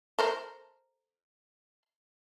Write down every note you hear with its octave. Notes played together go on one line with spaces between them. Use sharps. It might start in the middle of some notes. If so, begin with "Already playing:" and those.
A4 A#4 C5